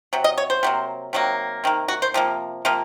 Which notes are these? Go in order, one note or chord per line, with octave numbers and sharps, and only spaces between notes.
C3 F#3
D#5
C#5
C5
C3 F#3 A#3
C3 D#3 F#3 A#3
C3 D#3 A#3
F#4
C5
C3 F3 A#3
C3 F3 A#3